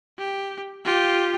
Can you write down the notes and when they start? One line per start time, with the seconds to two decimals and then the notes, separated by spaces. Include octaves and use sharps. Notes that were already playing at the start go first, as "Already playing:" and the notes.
0.18 G4
0.85 F4 G4